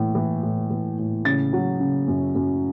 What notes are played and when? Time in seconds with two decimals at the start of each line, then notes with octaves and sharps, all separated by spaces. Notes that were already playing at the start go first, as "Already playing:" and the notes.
Already playing: A2 E3
0.15 E3
0.43 A2
0.71 E3
0.99 A2
1.25 C#3 A6
1.53 F#3
1.80 C#3
2.08 F#2
2.35 F#2